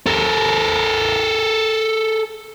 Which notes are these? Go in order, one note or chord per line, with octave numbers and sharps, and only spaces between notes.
A4 A#4